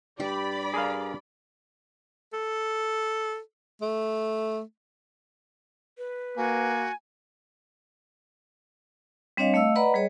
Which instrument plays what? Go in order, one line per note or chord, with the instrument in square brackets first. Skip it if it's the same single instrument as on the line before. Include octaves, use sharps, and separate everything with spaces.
[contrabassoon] G2 [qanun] G4 [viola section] D5 B5
[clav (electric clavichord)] G#4 A#4 F5
[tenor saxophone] A4
A3
[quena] B4
[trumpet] A#3 [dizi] F#4 [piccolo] G#5
[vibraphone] G3 C4 D4 C#5 D#5 F5
A3 D#5 F5 E6
B4 D5 D#5 F#5 A#5 B5
G3 G#4 C#5 D#5